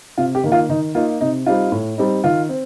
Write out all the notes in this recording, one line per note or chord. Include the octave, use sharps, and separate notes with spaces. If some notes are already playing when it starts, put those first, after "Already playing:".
C3 F4
G4
D#3 A#3
F4
D#3 D#4
A#3 D#4 F4
C3 D#4
G3 C4 D#4 F4
A2
G3 C4 D#4
D#3 F4
C4